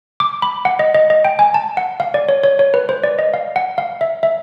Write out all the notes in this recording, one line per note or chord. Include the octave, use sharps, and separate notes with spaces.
D6
B5
F#5
D#5
D#5
D#5
G5
G#5
A5
F#5
F5
D5
C#5
C#5
C#5
B4
C5
D5
D#5
F5
F#5
F5
E5
E5